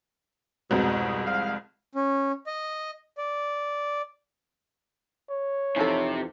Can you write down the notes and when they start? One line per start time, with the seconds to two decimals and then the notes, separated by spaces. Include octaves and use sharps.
0.71 C2 F2 G#2 B2
1.26 F5
1.95 C#4
2.47 D#5
3.18 D5
5.30 C#5
5.76 F2 C3 E3 F3 D#4 A4